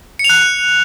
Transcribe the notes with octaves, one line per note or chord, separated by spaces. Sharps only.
C#7
F7
F#6